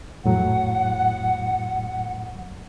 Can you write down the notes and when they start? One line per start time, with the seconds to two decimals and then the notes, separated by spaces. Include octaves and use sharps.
0.25 F2 A2 F#3 F#5